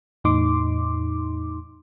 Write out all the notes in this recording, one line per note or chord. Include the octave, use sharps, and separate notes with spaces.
E2 A2 D#4 C6 D6